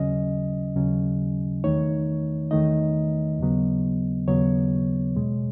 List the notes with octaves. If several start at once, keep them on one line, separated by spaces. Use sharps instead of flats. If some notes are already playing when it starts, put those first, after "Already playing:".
Already playing: D#2 C#3 F#3 C#4 D#5
D#2 C#3 F#3 C#4
E2 D#3 A3 D#4 C#5
E2 D#3 A3 D#4 D#5
D#2 C#3 F#3 B3
D#2 C#3 F#3 B3 C#5
E2 B2 G#3